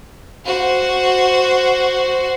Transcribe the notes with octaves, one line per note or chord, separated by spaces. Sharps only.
F#4 C5